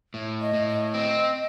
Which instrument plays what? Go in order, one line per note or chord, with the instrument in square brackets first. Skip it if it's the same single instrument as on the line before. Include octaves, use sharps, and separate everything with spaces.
[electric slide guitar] A2
[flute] D#5
[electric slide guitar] A2
[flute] D#5
[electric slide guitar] C4